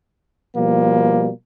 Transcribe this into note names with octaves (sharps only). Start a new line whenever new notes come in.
B2 F3 G3 A#3